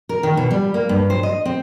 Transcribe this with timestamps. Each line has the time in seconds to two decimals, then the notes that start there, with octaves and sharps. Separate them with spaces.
0.09 A#4
0.23 D#3
0.37 B2
0.51 G3
0.74 A#3
0.89 G2
1.10 C5
1.23 D#5
1.45 C4